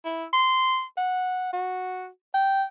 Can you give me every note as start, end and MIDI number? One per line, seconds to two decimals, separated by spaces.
0.05 0.26 64
0.33 0.83 84
0.97 1.52 78
1.53 2.08 66
2.34 2.63 79